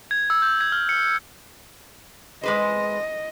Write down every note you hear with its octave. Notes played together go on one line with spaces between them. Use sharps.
G#6
E6
G6
G#6
F6
C#7
G#3 B4 C5 D#5